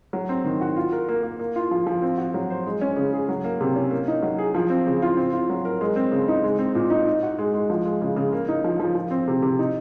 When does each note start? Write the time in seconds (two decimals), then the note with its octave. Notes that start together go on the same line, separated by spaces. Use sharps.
0.13 F#3
0.29 C4
0.44 D#3
0.61 F#4
0.76 F4
0.92 A#4
1.09 A#3
1.23 A#3
1.39 A#3
1.56 F4
1.71 F3
1.87 F3
2.02 C4
2.18 F#4
2.34 F#3
2.50 C5
2.66 G#3
2.81 C#4
2.97 C#3
3.13 G#4
3.29 F#3
3.44 A#3
3.61 C3
3.76 C#4
3.91 A#3
4.08 D#4
4.22 F#3
4.38 G#4
4.55 F3
4.70 C4
4.87 C#3
5.02 F4
5.17 C4
5.33 F4
5.50 F#3
5.65 A#4
5.81 G#3
5.96 C4
6.12 C#3
6.28 D#4
6.44 G#3
6.59 C4
6.75 A#2
6.90 D#4
7.06 D#4
7.23 F#4
7.38 G#3
7.54 G#3
7.70 F3
7.85 G#3
8.02 C#3
8.16 C#3
8.33 A#3
8.48 D#4
8.64 F3
8.80 F3
8.95 F3
9.11 C4
9.28 C3
9.42 C3
9.59 D#4